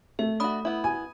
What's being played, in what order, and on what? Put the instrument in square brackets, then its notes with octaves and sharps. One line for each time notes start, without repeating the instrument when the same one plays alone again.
[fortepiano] A3 [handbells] E5
[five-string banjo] D4 F#4 [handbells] B5 D#6
[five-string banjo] B3 E4
[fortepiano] G#5